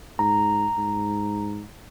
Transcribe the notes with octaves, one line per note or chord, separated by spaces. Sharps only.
G#2 A#5
G#2